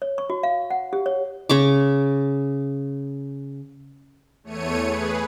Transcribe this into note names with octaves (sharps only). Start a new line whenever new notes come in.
C#5
C#6
F#4
F5
F#5
G4
C#5
C#3 C#6 D6
E2 A3 C#5 C#7 D#7
G#4 B4